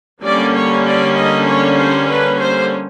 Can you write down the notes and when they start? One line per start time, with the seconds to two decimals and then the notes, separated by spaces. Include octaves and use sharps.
0.22 D3 G3 A#3 C#4 D5
0.54 C#5
0.85 D5
1.15 D#5
1.46 C#5
1.78 C5
2.08 B4
2.40 C5